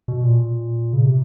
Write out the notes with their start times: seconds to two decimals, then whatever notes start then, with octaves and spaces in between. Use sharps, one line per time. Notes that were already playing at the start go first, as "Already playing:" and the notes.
0.08 B2
0.23 A#2
0.93 C#3
1.05 C3